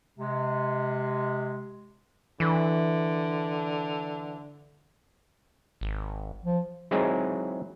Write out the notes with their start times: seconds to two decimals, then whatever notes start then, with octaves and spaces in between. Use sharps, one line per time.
0.19 C3 G#3
2.40 D3 E3
5.81 G#1
6.44 F3
6.91 F#3 G#3 C4 D#4 E4 G#4